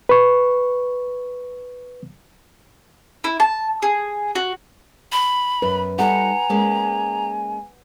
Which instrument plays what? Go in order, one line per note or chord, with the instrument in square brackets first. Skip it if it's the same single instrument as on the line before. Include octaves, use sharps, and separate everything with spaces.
[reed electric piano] B4 C#6
[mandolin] E4
A5
G#4
F#4
[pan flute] B5
[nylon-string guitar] F#2 [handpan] B4
[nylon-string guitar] G3 D#4 A4 [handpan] F#5 [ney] G#5 [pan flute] A#5
[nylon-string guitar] G#3 A#3 C#4